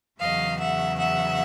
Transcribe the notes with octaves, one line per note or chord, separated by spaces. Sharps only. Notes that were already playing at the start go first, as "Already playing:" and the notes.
E2 C#3 F#3 D#5 F5
E5 F#5
E5 F#5